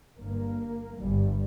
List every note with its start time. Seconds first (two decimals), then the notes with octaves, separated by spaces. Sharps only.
0.19 G1 G2 A#3
0.99 G1 G2 G3